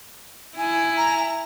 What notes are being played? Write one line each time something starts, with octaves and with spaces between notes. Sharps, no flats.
E4 G#5
A#5